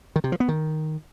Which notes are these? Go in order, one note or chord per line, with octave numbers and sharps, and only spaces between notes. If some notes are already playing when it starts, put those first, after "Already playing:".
D#3
C3
F3
B3
D#3